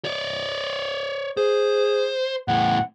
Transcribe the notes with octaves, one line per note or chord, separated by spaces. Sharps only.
C#5 D5
G#4 C5
E2 A2 F#5